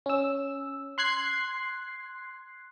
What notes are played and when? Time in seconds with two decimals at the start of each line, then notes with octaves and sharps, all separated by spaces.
0.06 C#4 E6
0.98 C6 F#6 G#6 C7